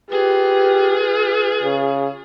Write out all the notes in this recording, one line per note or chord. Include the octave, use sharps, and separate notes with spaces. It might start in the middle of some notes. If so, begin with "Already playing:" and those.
F4 G4 G#4 B4
C#3